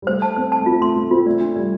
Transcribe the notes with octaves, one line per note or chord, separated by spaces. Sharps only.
G3
A3 C5
A5
C4 C5
A5
A3
C4 F4
A3 C6
A3 C6
C4 F4
A3 D5
D4
G3 D5